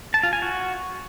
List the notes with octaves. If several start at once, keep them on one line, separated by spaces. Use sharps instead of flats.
A5
F4
G#5
F#4